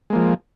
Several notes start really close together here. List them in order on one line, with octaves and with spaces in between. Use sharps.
G#3 A#3 F3